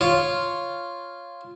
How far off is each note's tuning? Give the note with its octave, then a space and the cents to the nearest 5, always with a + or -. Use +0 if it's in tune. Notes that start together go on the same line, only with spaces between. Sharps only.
F4 -5 C#5 +0